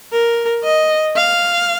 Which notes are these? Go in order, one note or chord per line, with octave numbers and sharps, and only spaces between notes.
A#4
D#5
F5